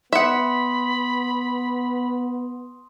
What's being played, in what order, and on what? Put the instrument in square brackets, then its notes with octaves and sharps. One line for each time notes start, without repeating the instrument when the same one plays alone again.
[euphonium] B3 [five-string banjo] E5 F#5 [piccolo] B5 [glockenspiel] C6 D#6